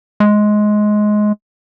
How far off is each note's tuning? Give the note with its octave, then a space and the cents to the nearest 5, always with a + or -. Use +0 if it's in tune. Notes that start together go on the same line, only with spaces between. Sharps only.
G#3 +15